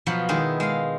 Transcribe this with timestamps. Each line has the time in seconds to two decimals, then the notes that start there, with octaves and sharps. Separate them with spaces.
0.06 B2 F3 F#3 B3
0.29 D#3 G#3 E4
0.60 G#3 F5